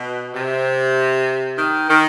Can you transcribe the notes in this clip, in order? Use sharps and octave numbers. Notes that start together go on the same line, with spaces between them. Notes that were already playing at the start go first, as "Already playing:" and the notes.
Already playing: B2
C3
D#3
D#3